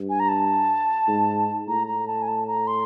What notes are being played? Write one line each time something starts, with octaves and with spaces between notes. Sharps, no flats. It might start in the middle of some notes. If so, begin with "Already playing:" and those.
Already playing: G2
G#5
A#5
A5
G#2
A2 A#5
A#5
A5
G#5
A5
A#5
C6